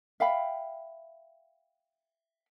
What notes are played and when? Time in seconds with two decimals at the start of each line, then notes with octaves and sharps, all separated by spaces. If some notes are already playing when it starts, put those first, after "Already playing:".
0.20 E5 F5 G5 B5